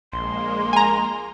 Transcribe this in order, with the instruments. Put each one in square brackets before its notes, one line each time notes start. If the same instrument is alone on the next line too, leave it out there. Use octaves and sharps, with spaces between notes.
[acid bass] A#1 [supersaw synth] G#3 A#3 [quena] C6
[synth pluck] G#5 A#5